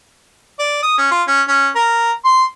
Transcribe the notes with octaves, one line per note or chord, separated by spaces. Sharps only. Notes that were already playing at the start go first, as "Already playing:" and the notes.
D5
D#6
C#4
F4
C#4
C#4
A#4
C6